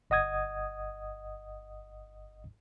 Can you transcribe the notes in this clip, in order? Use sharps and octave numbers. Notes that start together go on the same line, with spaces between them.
G1 D#5 F#5 D#6 G#6